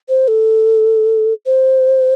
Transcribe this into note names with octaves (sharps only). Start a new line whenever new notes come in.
C5
A4
C5